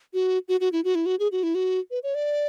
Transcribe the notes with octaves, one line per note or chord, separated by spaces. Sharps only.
F#4
F#4
F#4
E4
F#4
E4
F#4
G#4
F#4
E4
F#4
B4
C#5
D5